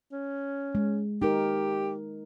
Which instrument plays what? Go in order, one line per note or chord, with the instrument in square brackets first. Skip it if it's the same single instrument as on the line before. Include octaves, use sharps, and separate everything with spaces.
[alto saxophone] C#4
[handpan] G#3
[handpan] D#4 A#4 [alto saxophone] G4